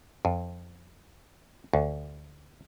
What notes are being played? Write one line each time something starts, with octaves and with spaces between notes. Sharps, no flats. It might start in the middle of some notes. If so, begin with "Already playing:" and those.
F2
D2